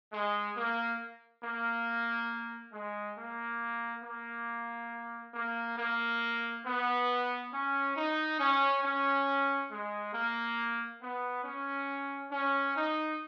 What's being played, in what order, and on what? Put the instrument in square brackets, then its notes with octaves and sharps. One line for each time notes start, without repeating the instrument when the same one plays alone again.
[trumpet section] G#3
A#3
A#3
G#3
A#3
A#3
A#3
A#3
B3
C#4
D#4
C#4
C#4
G#3
A#3
B3
C#4
C#4
D#4